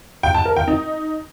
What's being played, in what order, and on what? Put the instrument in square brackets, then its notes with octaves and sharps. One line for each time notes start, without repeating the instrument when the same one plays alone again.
[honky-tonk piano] G5
A5
A#4
G5
D#4